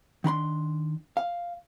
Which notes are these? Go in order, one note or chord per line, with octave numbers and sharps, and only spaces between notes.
D#3 D4 B5 C6
F5